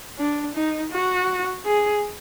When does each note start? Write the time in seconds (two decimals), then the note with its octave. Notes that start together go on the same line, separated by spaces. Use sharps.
0.18 D4
0.55 D#4
0.92 F#4
1.65 G#4